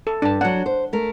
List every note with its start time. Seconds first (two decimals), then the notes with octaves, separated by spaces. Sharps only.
0.07 A4
0.22 G2 D4 A5
0.41 F#3 D4 F#5
0.66 C5
0.93 A3 A#4